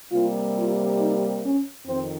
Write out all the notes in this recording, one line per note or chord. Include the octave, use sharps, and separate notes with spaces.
C3 G3 A#3 F4
F4
D#4
C#4
F2 D#3 C4